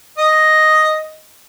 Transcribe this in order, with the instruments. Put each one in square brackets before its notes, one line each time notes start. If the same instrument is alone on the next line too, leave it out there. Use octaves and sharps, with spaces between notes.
[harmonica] D#5